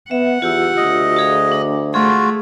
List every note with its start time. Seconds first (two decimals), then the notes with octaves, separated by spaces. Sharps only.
0.11 B3 E5 F#5
0.42 E2 F4 G4 E6
0.77 D2 D#5
1.16 F#4 G#4 F5
1.52 D4
1.94 A3 F4 F#4 G#4